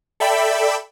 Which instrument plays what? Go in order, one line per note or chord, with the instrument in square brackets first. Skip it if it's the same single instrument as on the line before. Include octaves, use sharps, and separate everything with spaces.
[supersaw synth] A4 D5 E5 G5 B5 E6